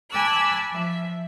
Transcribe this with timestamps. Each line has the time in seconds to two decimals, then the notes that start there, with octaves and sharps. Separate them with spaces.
0.10 G#5 A5 B5 D6 E6 F#6
0.70 F3 E5